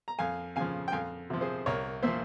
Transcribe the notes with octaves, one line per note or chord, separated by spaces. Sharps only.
A#5
F2 F5 G#5
C#3 F3 F5 G#5
G5
F2 F5 G#5
C3 F3
G#4 C5
C2 A#4 C#5
A#2 F3 C5 E5